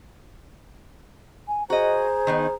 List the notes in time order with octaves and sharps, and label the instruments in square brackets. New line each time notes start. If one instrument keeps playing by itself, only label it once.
[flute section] G#5
[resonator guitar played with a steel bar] F#4 D#5 [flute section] G#4 C5 A#5
[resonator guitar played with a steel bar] D#3 B3 D#4